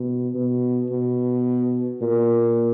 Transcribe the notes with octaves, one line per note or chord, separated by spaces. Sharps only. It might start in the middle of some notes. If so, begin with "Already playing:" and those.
Already playing: B2
B2
B2
A#2